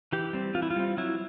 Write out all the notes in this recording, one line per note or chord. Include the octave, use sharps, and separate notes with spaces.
E3 G4
G3 C4
E3 F4
E4
F4
G3 C4
F#3 E4